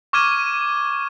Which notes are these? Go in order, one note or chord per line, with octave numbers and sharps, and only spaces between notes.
C#6 D6 F6 G#6 D#7